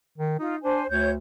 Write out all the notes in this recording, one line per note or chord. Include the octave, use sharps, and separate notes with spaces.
D#3
D#4 F4
D4 C5 G#5
D2 C#5 G6